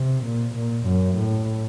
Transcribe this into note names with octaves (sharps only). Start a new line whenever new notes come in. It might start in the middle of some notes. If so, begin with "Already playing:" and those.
Already playing: C3
A#2
A#2
F#2
A2